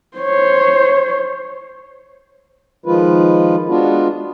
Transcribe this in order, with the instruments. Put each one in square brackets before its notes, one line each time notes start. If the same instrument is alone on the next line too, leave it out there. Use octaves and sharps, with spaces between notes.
[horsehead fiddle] C5 C#5
[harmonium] D#3 F3 G#3 F4 B4
G#3 B3 D4 F4 F#4